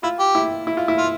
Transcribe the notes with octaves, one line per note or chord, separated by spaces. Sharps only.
E4 F4
G4
E4
E4
F4
E4
F4